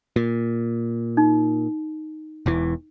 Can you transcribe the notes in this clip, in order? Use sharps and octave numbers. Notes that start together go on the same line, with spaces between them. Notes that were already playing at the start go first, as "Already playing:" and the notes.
A#2
D#4
E1 E2 E3